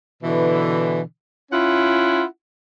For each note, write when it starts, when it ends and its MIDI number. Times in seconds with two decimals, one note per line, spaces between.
0.23 1.00 47
0.23 1.00 50
0.23 1.00 52
1.52 2.23 61
1.52 2.23 64
1.52 2.23 65
1.52 2.23 78